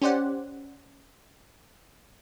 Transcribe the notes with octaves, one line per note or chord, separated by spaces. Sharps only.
C#4 G4 C5 D5 F#5